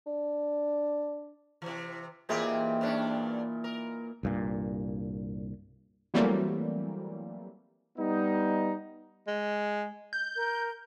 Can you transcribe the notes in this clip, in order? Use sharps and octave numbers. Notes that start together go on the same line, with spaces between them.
D4
C3 E3
A#2 E3 C4 D#4 G4 G#4
G2 C#4 D4
A#4
C2 G2 A#2
E3 F#3 G3 A3 A#3 C4
G3 B3 D#4
G#3
G6
A#4